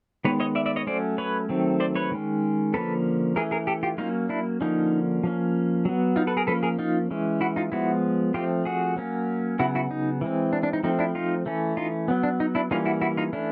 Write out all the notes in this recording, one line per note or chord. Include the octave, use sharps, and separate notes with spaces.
D#3 G#3 B3 B4 C#5
C#5 D#5
D5 E5
D5 E5
C#5 D#5
F#3 A3 C#4 C5 D5
B4 C#5
D#3 F#3 A3 C4
C5 D5
B4 C#5
D#3 G#3 C#4
D3 F3 A#3 C#4 A4 B4
E3 A3 C#4 G#4 A#4
G#4 A#4
G4 A4
F4 G4
F#3 A#3 C#4 D#4 F4
D4 E4
D3 F3 A#3 C#4 D#4
F3 A#3 C#4
F#3 B3
D#4 F4
A4 B4
G#4 A#4
F3 A#3 C#4 A4 B4
G#4 A#4
D#4 F4
E3 G#3 C#4
E4 F#4
D#4 F4
F3 G#3 B3 E4 F#4
F3 A3 C4 F4 G4
F#4 G#4
F#3 A#3 C#4
C#3 F#3 B3 E4 F#4
E4 F#4
D#4
E3 G#3 C4
D4
D4
D#4
F3 A3 C4 D#4
D4 E4
D#4 F4
E3 A3 C#4
D#4 F4
F#3 B3
D4
D#4
D4 E4
E3 G3 A#3 C#4 D#4 F4
E4 F#4
E4 F#4
D#4 F4
E3 A3 C#4 D4 E4